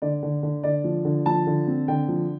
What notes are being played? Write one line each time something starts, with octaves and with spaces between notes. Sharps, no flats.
D3 D5
D3
D3
D3 D5
F3
D3
F3 A5
D3
C4
D3 G5
F3